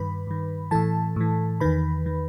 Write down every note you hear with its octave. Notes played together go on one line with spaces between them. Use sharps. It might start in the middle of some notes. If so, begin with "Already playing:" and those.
Already playing: G2 D#3 B4 B5
G2 D#3
A2 E3 A4 A5
A2 E3
E2 D#3 B4 B5
D#3